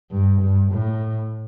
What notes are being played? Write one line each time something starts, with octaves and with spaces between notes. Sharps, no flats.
G2
G2
A2